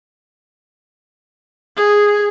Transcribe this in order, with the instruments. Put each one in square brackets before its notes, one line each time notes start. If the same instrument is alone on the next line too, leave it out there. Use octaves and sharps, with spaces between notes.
[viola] G#4